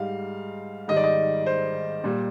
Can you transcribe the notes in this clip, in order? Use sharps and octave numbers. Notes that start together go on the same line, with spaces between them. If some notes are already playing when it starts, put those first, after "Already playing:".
Already playing: G#2 G3 F5
G#2 D#3 G3 D#5
D5
D#5
C5
A#2 G3